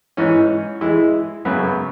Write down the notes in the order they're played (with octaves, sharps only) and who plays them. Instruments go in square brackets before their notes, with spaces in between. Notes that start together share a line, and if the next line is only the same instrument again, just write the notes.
[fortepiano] G#2 E3 C#4
E3 G#3 E4
F#2 C#3 F#3 B3